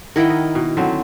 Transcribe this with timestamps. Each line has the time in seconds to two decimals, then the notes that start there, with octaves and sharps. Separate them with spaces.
0.16 D#3 E4 A#4 D#5 F#5 G5
0.30 D#5
0.55 B2
0.77 D3 F#3 C4